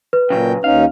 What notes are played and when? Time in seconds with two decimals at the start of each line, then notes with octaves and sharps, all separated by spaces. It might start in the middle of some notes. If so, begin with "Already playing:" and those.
0.13 B4
0.30 A#2 C#3 F#3 G5
0.64 D#2 C#4 D#4 F5